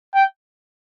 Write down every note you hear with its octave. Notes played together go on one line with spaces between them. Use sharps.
G5